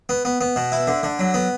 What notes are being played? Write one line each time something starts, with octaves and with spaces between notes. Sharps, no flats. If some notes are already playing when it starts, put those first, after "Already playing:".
B3
B3
B3
B2
E4
D3
D3
F#3
B3